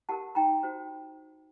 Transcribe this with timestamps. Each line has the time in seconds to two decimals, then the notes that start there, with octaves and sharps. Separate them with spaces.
0.09 G4 A#4 F#5 A5
0.35 D#4 G5 A#5
0.63 F#4 C5